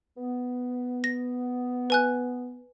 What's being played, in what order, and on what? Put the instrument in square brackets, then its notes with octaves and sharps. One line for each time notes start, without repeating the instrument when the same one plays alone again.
[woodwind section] B3
[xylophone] A#6
B4 G#5 F#6